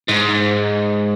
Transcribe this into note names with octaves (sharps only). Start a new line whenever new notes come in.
G#2